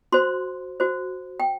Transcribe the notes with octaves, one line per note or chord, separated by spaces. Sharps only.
F#4 C5 C6
F#4 C5
G5